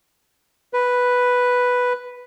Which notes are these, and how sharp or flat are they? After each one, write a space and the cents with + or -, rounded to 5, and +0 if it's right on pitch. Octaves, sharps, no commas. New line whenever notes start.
B4 +0